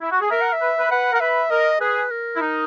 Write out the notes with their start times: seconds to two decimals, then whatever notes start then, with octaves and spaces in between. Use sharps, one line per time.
0.01 E4
0.11 F#4
0.21 G#4
0.30 A#4 E5
0.41 F#5
0.53 E5
0.61 B4
0.78 B4
0.91 B4 F#5
1.12 A#4 F#5
1.20 B4 E5
1.50 A#4 D#5
1.81 G#4 B4
2.11 A#4
2.36 E4
2.40 D#4